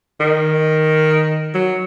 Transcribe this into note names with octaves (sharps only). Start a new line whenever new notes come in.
D#3
F#3